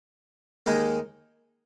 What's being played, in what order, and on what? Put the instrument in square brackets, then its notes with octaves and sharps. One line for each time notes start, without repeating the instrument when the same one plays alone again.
[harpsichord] D#2 D#3 G#3 D#4